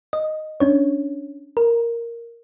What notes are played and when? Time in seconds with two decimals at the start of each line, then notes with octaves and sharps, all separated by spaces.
0.13 D#5
0.60 C#4 D4 C#5
1.57 A#4